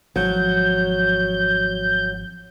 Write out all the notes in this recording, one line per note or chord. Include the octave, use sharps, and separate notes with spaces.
G#1 F3 F#3 G6